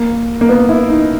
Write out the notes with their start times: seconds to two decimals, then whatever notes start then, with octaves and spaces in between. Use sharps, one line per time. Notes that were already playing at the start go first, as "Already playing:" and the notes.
Already playing: A#3
0.41 A#3
0.49 B3
0.69 E4
0.89 D#4